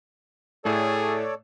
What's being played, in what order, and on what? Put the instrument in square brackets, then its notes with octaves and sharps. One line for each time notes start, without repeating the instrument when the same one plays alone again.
[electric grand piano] A2 A3 [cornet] G#4 [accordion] A4 C#5 D5